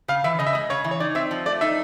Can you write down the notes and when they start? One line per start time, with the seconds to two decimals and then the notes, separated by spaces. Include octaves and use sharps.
0.08 C#3 F5
0.24 E3 E5
0.39 C#3 D#5
0.47 E5
0.53 G#3 D#5
0.70 C#3 C#5
0.84 E3
0.91 C#5
1.00 D#4 D5
1.15 C4 E5
1.31 F3
1.46 A3 D5
1.61 D#4 E5